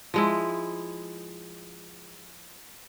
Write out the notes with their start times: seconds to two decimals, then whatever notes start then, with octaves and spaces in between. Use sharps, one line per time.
0.14 F3 G#3 E4